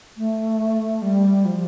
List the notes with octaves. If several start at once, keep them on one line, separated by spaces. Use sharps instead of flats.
A3
G3
F3